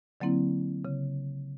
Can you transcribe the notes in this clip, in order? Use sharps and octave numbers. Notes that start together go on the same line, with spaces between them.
D3 F#3 A#3 C4 E4
C#3